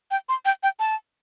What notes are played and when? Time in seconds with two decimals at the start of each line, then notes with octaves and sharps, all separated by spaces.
0.11 G5
0.29 C6
0.45 G5
0.63 G5
0.80 A5